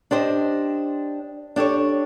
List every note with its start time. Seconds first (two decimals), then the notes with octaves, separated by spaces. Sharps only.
0.11 D4 G4 C5 D#5
1.56 D4 G4 A4 C#5